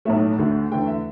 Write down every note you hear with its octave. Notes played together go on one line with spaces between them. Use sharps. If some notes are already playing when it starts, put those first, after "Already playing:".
B1 A2 A3 E5
D2 D3 A3
E2 D3 A3 G5
E5